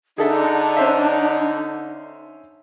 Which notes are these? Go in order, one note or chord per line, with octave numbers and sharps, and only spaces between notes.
D3 D4 D#4 G#4 A4 E5
C#4 C5 E5